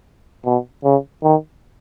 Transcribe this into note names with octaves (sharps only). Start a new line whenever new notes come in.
B2
C#3
D#3